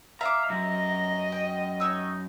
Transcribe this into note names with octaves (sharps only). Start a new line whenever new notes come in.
E5 F5 A#5 D6
F#2 D#5 A#5
G5
D#4 C#5 E6